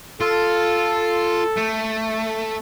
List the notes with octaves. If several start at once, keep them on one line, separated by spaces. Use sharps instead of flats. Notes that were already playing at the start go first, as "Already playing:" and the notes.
F4 A4
A3